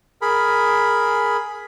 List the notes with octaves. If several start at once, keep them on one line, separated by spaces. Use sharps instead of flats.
G#4 A#4 B5